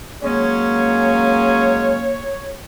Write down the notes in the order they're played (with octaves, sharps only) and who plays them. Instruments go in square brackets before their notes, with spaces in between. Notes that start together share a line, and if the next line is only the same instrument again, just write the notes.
[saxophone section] F#3 G#3 C#4 [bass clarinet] A#3 [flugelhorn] C#5